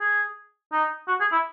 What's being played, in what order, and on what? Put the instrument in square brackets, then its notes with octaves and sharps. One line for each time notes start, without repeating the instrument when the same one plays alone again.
[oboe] G#4
D#4
F#4
G#4
E4